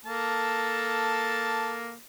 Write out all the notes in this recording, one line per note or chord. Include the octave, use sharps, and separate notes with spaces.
A#3 A4 A5